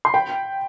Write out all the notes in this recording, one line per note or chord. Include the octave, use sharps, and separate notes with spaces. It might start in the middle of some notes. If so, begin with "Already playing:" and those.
C6
G5 B5